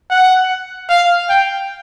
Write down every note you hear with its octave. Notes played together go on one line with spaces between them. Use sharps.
F#5
F5
G5